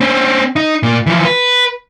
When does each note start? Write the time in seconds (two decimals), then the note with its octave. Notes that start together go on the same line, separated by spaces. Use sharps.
0.01 C4 C#4
0.56 D#4
0.83 A#2
1.06 E3 F3
1.25 B4